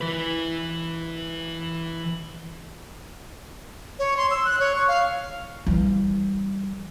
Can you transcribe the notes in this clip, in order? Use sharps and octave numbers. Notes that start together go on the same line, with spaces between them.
E3 B4
C#5
C6
E6
F#6
C#5
C#6
F5
E3 G3